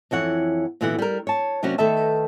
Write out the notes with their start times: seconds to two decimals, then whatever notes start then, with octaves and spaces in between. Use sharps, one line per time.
0.11 F2 E3 C#5 F#5
0.81 A#2 D3 E3 B3 F#4 F#5
0.99 G3 A#4
1.27 C#5 A5
1.63 C3 F#3 A#3 C#4 D4 F#4
1.78 D#3 A3 A4 B4 E5 A5